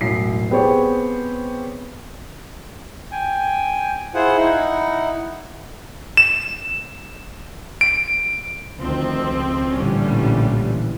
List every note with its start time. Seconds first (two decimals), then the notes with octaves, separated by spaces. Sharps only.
0.01 E1 A1 F#3 C7
0.51 B3 C4 G4 G#4 C5 C#5
3.12 G5 G#5
4.14 E4 F4 G#4 C5 F#5
4.37 D#4 E4 F#5
6.17 E7
7.81 D7
8.79 D2 D#3 F3 C4
9.27 C#2
9.74 A#1 A2 D3 E3 G3 C#4 F4